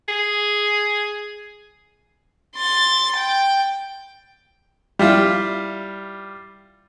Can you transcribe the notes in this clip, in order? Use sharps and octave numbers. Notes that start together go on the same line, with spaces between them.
G#4
C6 A6
G5
G3 E4 F4